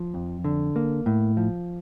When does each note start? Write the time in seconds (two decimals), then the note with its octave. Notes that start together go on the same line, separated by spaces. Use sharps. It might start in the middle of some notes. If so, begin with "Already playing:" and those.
Already playing: F3
0.14 F2
0.45 D3
0.76 A#3
1.06 A2
1.37 F3